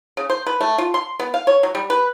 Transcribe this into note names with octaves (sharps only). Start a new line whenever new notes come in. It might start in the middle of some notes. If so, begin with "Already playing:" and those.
C#3
C5
B4
A3
F4
C6
B3
F5
C#5
F#3
G3
B4